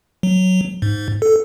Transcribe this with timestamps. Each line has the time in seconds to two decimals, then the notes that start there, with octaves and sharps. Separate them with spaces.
0.23 F#3
0.82 G#2
1.22 A4